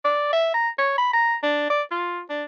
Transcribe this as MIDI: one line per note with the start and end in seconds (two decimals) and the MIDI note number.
0.05 0.32 74
0.33 0.52 76
0.54 0.69 82
0.78 0.94 73
0.98 1.13 83
1.13 1.35 82
1.43 1.69 62
1.70 1.83 74
1.91 2.22 65
2.30 2.44 62